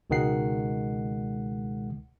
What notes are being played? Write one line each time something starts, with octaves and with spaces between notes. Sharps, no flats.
C#2 B2 D#3 G#3 F#5 C7